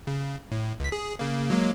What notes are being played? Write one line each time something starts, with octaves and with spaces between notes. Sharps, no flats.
C#3
A2
C#2 B6
G#4
C#3 A#3
F#3 G#3 A#3